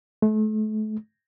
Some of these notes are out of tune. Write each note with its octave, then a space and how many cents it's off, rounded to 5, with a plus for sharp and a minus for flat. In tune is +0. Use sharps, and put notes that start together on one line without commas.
A3 -35